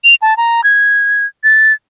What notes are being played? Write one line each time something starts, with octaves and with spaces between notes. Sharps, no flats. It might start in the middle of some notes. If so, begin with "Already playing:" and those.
F7
A5
A#5
G#6
A6